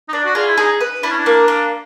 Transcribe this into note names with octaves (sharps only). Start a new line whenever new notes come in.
D#4
D4 D5
F#4
F4 G#4
E4
D#4 G#4
B4
D4 E4
C#4
D4
A#3
A#3